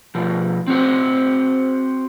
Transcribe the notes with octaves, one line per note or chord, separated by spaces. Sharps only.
B2 F3
C4 F#4 C5